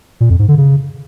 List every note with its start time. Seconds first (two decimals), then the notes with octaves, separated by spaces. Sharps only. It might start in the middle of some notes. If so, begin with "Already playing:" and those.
0.21 A#2
0.30 F2
0.39 G#2
0.48 D3
0.58 C#3